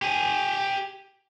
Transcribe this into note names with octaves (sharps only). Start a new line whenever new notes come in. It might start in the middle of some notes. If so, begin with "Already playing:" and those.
G4 G#5